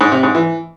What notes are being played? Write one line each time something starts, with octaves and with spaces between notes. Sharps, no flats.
G#2
C3
G#2
E3